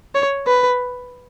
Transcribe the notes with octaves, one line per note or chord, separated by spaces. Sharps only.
C#5
B4